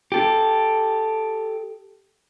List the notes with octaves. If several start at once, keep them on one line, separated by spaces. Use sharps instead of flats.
G4 A4